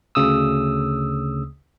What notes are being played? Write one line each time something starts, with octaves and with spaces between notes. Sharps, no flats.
D2 C#3 D#6 E6